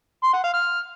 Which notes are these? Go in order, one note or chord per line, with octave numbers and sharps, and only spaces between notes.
C6
F#5
F5
F6